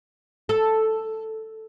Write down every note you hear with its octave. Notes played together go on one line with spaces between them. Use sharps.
A4